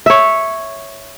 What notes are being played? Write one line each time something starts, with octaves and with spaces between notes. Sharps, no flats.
C#5 E5